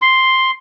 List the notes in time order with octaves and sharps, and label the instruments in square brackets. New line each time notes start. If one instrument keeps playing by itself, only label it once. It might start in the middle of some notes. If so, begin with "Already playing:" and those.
[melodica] C6